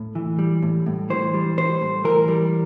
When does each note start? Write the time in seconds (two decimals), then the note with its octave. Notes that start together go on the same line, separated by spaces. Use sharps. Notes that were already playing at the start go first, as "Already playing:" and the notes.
Already playing: A2
0.15 E3
0.39 G3
0.63 A2
0.86 A2
1.10 E3 C5
1.34 G3
1.57 A2 C5
1.81 A2
2.04 E3 A#4
2.28 G3